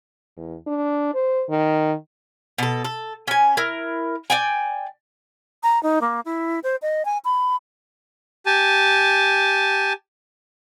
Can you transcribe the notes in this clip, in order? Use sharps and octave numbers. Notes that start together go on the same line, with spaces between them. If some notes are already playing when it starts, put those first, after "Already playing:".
E2
D4
C5
D#3
B2 A4
A4
C#4 G#5
E4 A#4
D5 G5 G#5
A#5
D#4
A#3
E4
C5
D#5
G#5
B5
G4 G#5 A5